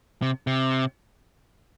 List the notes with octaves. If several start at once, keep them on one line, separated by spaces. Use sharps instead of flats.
C3
C3